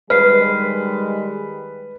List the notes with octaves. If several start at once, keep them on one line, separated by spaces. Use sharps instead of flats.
D#3 G3 G#3 B4 F6 C7